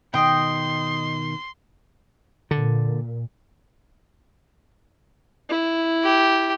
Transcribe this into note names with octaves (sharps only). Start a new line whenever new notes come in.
B2 D#3 D#5 G5 C6
A#2 D3
E4
G4